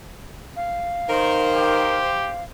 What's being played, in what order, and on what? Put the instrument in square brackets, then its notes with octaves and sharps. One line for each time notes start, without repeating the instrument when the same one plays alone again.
[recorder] F5
[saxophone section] D#3 A#4 [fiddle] C5
[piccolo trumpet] G4